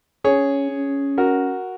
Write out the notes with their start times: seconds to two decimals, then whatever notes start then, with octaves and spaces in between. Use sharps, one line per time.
0.24 C#4 G#4 C#5
0.71 C#4
1.18 F#4 A#4